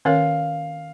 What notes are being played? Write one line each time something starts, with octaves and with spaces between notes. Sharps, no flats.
D#3 C#4 A#4 C#5 F5